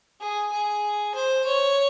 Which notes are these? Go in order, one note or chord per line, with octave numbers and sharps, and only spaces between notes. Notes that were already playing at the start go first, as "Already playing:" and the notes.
G#4
G#4
C5
C#5